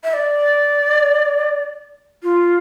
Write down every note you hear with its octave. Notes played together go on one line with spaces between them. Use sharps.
E5
D5
F4